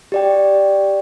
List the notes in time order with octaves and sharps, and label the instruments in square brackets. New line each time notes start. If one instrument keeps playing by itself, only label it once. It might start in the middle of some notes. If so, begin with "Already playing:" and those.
[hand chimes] G4 D5 G5